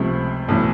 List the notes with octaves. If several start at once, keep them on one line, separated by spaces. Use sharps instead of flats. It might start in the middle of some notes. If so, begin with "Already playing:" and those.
Already playing: C#2 C3 F3 A3
B1 A2 E3